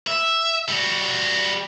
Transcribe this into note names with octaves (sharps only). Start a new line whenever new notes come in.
E5
G3 F#4